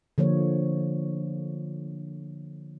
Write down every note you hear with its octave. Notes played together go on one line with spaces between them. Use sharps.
D3 F3 A#3 C#5